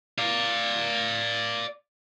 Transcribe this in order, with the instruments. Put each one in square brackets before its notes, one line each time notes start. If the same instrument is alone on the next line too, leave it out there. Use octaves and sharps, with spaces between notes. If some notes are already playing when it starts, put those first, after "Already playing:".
[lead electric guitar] D5 F5